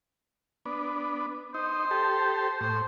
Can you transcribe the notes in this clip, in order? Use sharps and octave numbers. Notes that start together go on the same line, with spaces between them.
B3 D4
D#4 C5
G4 A4
A2 C5